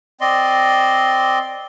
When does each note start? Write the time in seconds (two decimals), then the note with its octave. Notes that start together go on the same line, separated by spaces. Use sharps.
0.21 C4 D5 D#5 C6